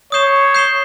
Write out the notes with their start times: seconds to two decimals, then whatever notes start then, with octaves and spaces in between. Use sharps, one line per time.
0.12 C#5 D#6 G6 C7 E7 G7
0.54 D#6 G6 C7 E7 G7